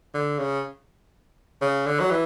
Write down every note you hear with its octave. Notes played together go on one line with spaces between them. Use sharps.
D3
C#3
C#3
D3
F#3
E3